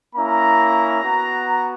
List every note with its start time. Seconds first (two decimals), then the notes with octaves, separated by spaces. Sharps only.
0.14 A#3 C#4 E4 A#5
1.01 B3 F#4